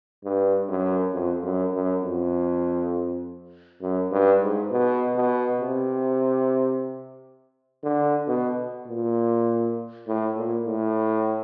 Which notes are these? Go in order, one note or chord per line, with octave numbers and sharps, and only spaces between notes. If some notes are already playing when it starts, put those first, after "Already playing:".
G2
F#2
F2
F#2
F#2
F2
F#2
G2
G#2
B2
B2
C3
D3
B2
A#2
A2
A#2
A2